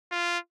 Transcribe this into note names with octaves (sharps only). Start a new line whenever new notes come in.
F4